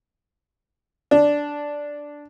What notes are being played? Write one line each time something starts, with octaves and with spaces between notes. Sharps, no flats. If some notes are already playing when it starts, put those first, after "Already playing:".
D4